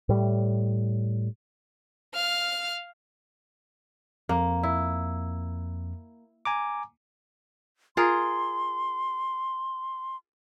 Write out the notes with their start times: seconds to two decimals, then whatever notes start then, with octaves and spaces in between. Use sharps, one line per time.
0.09 A2 G3
2.14 F5 F6
4.29 F2 A#3
4.63 E4
6.45 G#5 A#5 D6
7.97 F4 G#4 A#4 C6